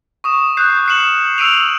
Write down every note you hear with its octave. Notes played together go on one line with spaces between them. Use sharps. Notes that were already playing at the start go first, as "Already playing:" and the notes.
C#6 D#6 E7
D#6 F#6 G6 C7
F6 F#6 C7 C#7 E7 F#7
E6 C7 D7 D#7 F7